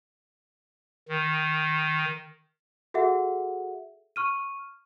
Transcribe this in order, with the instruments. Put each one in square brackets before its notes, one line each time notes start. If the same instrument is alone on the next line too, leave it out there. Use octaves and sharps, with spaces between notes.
[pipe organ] D#3
[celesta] F#4 G#4 A4 E5 F#5
C#6 F6 D#7